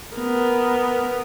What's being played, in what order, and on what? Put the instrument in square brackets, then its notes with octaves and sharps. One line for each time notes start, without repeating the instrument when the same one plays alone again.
[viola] B3 A#4